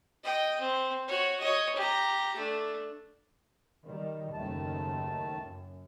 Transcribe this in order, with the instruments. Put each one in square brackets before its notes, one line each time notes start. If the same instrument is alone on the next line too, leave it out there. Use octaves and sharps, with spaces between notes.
[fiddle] D#5 G5
C4
F#4 C#5
C#5 D#5
G4 A#5
A3 D4
[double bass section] D#3 G3
[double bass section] F#1 D#2 [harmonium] D#3 A3 A5
[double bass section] F#2